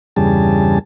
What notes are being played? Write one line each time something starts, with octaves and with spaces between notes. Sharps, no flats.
E2 G2 C#3 G3 G#4 A5